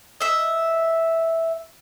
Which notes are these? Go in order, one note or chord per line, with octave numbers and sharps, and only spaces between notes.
D#5 E5